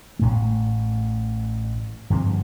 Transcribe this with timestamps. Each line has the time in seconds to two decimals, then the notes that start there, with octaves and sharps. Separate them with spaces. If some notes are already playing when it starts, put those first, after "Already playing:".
0.19 A1 A2 A3
2.10 G2 D3 F3 C4